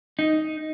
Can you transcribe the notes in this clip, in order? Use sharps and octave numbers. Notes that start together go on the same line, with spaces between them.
D#4